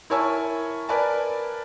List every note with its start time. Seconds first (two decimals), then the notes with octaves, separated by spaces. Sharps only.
0.10 E4 A#4 C#5 G#5 A5 E6
0.89 A#4 B4 D5 G#5 A5